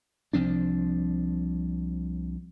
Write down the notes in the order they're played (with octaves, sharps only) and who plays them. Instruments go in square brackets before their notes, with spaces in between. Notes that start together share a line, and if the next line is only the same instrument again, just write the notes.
[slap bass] C2 F3 C4 D4